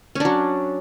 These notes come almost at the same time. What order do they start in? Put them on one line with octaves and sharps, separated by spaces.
C#4 D4 F#3